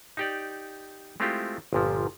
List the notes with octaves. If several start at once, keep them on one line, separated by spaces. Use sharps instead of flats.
D#4 G4 D5
G#3 A3 C4 E4 F4 G4
G1 A#2 F3